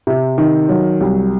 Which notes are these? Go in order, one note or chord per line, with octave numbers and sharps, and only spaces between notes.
C3
D#3
F#3
C2